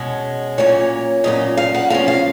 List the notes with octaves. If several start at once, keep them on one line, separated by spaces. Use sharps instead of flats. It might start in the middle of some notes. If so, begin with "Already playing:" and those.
Already playing: B2 G#3 C#4
A#2 F#3 A#3 C#4 C#5
A#2 F#3 A#3 C#4 D#5
F5
F#5
F3 A#3 C#4 F5
F5